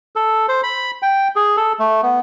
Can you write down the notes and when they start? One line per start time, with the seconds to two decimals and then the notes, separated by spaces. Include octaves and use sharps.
0.16 A4
0.48 C5
0.63 B5
1.02 G5
1.36 G#4
1.57 A4
1.79 A3
2.03 B3